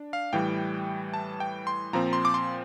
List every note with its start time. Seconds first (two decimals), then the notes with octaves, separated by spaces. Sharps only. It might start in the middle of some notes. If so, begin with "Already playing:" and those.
Already playing: D4
0.13 F5
0.33 A2 E3 G3 G5
1.14 A5
1.40 G5
1.67 C6
1.93 A#2 F3 C4 A#5
2.13 C6
2.25 D6
2.34 C6